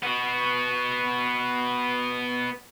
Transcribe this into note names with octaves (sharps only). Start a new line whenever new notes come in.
B3 F#4